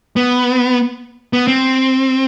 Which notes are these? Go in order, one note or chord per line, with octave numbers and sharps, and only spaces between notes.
B3
B3
C4